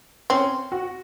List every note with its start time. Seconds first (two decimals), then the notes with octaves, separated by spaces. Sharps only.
0.30 C4 C#4
0.72 F#4